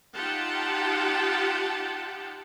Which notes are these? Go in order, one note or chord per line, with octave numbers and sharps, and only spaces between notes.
D#4 F4 G4 F#5 G5 A5